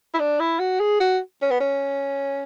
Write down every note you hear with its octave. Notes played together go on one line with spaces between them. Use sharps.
E4
D4
E4
F#4
G#4
F#4
C#4
B3
C#4